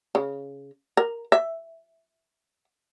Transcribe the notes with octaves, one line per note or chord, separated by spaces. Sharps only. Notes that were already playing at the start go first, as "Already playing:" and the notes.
C#3
A#4
E5